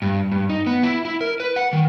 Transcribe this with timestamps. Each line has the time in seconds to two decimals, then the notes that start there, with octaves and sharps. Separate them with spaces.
0.02 G2
0.32 G2
0.49 D#4
0.66 B3
0.83 E4
1.05 E4
1.21 A#4
1.40 B4
1.56 F#5
1.73 D#3